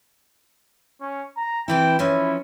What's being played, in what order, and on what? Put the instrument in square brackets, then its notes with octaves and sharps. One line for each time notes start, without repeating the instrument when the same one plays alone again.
[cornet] C#4
A#5
[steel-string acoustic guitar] C3 E3 E4 [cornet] G5
[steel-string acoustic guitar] E3 F3 C#4 [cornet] E4